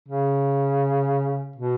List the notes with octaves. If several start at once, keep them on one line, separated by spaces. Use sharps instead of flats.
C#3
B2